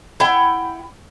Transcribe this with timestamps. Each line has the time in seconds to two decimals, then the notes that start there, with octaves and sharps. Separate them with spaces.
0.20 E4 F#5 G5